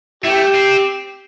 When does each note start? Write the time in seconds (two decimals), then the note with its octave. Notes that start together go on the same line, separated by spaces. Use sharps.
0.24 A3 E4 G4
0.55 C4